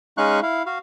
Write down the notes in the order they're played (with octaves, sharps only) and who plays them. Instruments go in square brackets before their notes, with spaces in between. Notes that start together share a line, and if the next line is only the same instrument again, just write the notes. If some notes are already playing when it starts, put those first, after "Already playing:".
[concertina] G#3 C#4 D#4 F5 C#6 F#6
E4 F5
F#4 F5